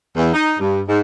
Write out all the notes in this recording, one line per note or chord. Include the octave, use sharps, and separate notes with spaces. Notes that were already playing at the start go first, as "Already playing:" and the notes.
E2
D#4
G2
G#2